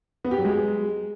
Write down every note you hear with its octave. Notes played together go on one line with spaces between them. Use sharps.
B3
G4
F#3
G#3